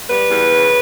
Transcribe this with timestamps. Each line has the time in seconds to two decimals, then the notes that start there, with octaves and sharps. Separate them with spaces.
0.09 G3 B4
0.30 E2
0.51 C#3